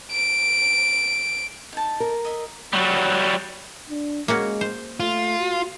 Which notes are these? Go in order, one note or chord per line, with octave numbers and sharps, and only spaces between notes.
D7
D#4 A5
A#4
D#5 E5
F#3 G3
D4
G#3 A#3 C#4 F#4
C5
A3 F4
F#4